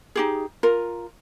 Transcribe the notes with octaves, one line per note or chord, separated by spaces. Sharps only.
D#4 G4 G#4
F4 A#4